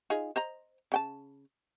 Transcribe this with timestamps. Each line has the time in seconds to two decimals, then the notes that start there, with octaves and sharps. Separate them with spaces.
0.10 D#4 F4 G#4
0.36 C5 D#5 A#5
0.92 C#3 G5 A5